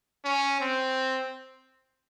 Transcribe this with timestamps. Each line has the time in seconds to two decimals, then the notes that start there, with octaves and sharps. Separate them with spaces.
0.25 C#4
0.60 C4